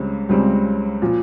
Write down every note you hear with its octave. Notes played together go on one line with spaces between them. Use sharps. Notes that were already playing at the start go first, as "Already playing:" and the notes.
Already playing: C#2 C#3 G3 C4
C#2 C#3 G3 C4
A#2 F3